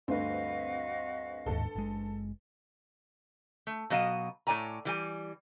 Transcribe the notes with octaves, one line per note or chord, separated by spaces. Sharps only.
D2 G2 C4 F#4 B4 D#5 F5
D1 D#2 G#2 A4
F#1 G#3
A3
B2 F#3 D#5 F5
A2 C#5 D5 G#5 A#5
E3 G3 G#5